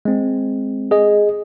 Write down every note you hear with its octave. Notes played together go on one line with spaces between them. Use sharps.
G#3 C4
G#4 D#5